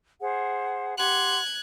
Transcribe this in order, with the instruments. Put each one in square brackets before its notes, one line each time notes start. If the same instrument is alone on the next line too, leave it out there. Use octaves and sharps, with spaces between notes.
[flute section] G#4 C5 F#5
[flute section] G4 F#5 C6 [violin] F#6 G#6